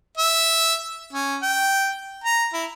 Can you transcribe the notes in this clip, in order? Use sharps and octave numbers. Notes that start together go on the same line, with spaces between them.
E5
C#4
G5
A#5
E4